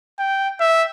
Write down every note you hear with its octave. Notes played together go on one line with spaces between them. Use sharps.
G5
E5